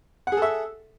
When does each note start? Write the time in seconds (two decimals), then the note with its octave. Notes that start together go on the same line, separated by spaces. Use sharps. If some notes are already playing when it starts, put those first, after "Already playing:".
0.27 F#5
0.32 G#4
0.37 A4
0.42 E5